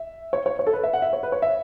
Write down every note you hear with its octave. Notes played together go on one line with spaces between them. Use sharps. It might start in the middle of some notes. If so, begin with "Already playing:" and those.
Already playing: E5
C#5
C#5
C#5
A4
B4
E5
F#5
E5
C#5
B4
C#5
E5